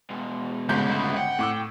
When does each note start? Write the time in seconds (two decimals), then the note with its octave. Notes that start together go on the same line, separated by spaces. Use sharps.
0.10 B2 G#3
0.69 G1 D2 G#2 C#3 G6
0.90 B3 E4
1.17 F#5 G5
1.39 A2 D6 E6